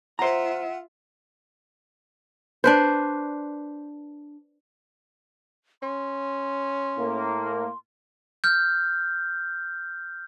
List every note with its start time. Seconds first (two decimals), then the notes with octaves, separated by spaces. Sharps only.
0.19 F4 C5 E5 F#5 A#5
2.64 D4 B4 C5
5.83 C#4 C6
6.98 A2 A#3
8.44 F6 G6